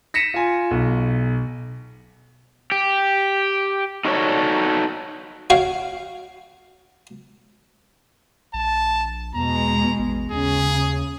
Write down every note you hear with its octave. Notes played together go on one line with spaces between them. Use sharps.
A#6 B6 C#7 D#7 E7
F4 G#5
B1
G4
D#4 F#4 A4 B4 C#5 D5
F#4 C#5 F5 G5
A#1 A5
E2 B2 G#3 A#5
A1
D#2 C#3 G#4